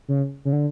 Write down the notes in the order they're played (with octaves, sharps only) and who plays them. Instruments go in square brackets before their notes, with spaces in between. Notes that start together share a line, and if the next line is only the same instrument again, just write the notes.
[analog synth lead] C#3
C#3
D3